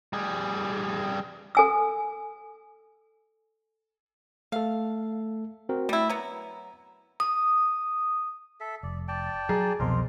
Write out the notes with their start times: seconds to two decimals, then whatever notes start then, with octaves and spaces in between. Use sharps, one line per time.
0.13 G3 G#4
1.55 A4 G#5 E6
4.52 A3 A4 F5
5.69 C4 F#4 A#4
5.89 G3 A3 E4
6.10 F#3 B3 A#5
7.20 D#6
8.60 A4 E5
8.83 F1 D5
9.08 D5 G5 A5
9.49 F#3 G#4 A#5
9.79 C2 F2 B2 F4 A#4 C6